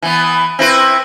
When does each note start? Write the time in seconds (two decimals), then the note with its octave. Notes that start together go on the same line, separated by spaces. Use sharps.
0.02 E3 B3
0.59 C4 E4 B4